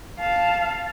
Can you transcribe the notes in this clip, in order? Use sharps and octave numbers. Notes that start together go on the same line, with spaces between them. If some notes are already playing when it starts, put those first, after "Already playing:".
F5 A5